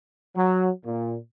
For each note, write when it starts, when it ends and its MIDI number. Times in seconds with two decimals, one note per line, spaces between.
0.36 0.70 54
0.86 1.16 46